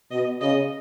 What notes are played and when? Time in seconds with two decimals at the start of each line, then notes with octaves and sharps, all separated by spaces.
0.11 B2 D#5
0.41 C#3 D#5